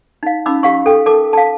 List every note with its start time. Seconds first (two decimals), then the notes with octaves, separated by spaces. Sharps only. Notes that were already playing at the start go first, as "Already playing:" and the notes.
0.23 D#4 F5
0.46 C#4 D#4 B5 D6 E6
0.63 G4 F5 C#6
0.86 A4 G5
1.06 A4 A#4 A5 D6
1.33 F5 A5